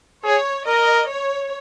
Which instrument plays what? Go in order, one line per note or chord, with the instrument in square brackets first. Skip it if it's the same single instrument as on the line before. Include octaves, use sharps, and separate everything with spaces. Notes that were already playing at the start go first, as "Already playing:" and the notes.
[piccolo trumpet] G#4 [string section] C#5
[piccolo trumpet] A#4 [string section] D#5
[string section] C#5